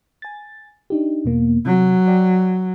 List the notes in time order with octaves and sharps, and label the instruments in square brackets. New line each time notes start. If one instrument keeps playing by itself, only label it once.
[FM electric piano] G#5 A6
D4 D#4 G4
E2 B2 A#3
[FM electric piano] C3 [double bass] F#3
[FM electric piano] D5 G5